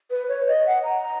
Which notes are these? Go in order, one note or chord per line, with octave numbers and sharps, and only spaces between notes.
B4
C#5
D#5
F#5
A#5